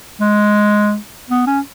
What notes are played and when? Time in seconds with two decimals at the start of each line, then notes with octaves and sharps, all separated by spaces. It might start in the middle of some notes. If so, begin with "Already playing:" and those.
0.21 G#3
1.30 B3
1.47 C#4